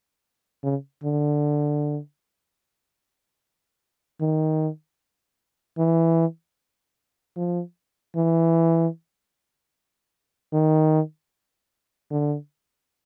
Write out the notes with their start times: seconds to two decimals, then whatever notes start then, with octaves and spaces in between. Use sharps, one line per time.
0.64 C#3
1.03 D3
4.21 D#3
5.78 E3
7.37 F3
8.16 E3
10.53 D#3
12.11 D3